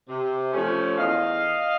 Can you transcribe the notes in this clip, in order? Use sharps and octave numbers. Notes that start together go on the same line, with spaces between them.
C3
F3 A3 C#4
E2 D#5 F5